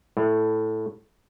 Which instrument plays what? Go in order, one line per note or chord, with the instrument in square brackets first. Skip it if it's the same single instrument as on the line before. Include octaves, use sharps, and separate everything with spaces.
[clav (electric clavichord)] A2